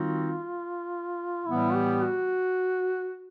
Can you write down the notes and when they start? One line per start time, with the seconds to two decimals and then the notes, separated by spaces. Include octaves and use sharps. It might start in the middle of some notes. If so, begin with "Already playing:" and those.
Already playing: D#3 G3 C4 D#4 F4 F#4
1.45 A2 E3 G3 B3 E4
1.74 G4
2.03 F#4